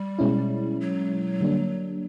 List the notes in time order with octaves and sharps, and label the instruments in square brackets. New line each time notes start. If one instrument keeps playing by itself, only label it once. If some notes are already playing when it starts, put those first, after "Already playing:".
Already playing: [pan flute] G3
[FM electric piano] B2 G#3 C#4 E4
[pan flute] F#3
[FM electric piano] D3 G3 A#3 D4